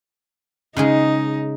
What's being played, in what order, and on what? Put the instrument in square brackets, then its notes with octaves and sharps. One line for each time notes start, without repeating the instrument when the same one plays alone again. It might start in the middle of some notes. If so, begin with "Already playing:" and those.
[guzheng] C#3 G#3 G#4 [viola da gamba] D#4